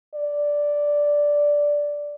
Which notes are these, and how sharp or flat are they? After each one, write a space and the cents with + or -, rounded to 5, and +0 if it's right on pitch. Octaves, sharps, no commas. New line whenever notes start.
D5 -5